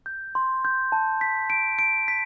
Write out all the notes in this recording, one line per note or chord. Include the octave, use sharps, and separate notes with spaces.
G6
C6
G6
A5
B6
D7
D7
B6